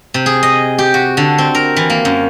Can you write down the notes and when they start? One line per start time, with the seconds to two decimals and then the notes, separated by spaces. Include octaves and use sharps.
0.14 C3
0.26 G#4
0.43 D#5
0.78 G4
0.94 F#4
1.17 D3
1.38 C4
1.55 A#4
1.76 E3
1.90 A#3
2.05 F#2